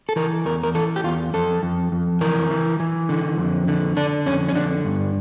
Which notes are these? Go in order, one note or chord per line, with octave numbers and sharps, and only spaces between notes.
A4
E3 A#4
E2 A#4
A#4
E3 A4
G4
E2 F4
F2 A4
F2
F2
E3 A#4
E3
E3
D3
F2
D3
D3 D4
F2 C#4
C#4
D3 D4
G2